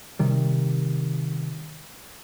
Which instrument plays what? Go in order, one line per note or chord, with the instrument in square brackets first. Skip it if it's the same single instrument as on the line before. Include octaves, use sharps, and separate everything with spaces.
[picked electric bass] C3 D#3 G3